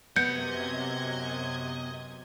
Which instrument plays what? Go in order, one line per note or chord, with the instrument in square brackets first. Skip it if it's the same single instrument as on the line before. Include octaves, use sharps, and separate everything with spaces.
[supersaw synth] F#2 C3 G#6 [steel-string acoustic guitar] B3 [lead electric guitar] D#5 [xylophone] G6 C#7